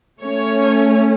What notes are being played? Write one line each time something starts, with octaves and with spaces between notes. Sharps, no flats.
A3 C#4 C#5